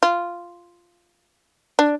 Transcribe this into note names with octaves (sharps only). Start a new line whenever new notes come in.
F4
D4